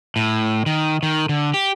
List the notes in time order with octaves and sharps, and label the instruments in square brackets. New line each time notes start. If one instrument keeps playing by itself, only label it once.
[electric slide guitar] A2
D#3
D#3
D3
G4